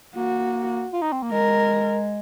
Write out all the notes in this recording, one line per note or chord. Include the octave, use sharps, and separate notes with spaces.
A#3 F#4
F4
D#4
C4
A#3
G#3 A#4